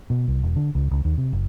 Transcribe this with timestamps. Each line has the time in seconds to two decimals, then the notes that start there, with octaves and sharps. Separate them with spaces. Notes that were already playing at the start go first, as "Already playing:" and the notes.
0.10 B2
0.28 C2
0.43 E1
0.56 D3
0.75 C#2
0.91 C#2
1.05 D#2
1.18 C3
1.33 F#1